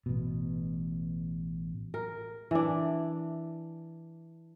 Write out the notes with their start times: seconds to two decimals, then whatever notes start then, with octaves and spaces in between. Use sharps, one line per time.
0.06 A1 B2
1.94 A#4
2.51 E3 D4